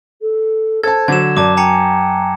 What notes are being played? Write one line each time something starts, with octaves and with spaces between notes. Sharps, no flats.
A4
A4 C5 A5 G#6
D3 F#3 G#6 E7
F#2 D5 A5 D6
G5 G#5 A#5 C#7